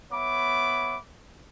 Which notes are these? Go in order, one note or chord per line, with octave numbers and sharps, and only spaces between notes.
B3 C#5 E5 B5 D6